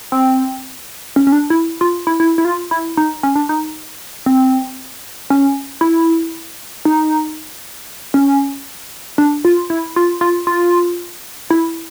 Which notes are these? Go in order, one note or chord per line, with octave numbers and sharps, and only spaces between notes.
C4
C#4
C#4
D4
E4
F4
E4
E4
E4
F4
E4
D#4
C#4
D4
D#4
C4
C#4
E4
D#4
C#4
D4
F4
E4
F4
F4
F4
E4